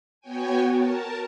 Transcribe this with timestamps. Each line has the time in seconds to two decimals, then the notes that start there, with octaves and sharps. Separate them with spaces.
0.21 B3 F#4 C#5 G5 G#5
0.72 A#4 A5